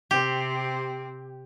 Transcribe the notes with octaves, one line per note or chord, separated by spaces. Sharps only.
C3 C4 G4